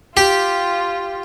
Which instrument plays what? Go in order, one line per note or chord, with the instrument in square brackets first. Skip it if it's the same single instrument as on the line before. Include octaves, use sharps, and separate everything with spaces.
[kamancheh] F4 [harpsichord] G4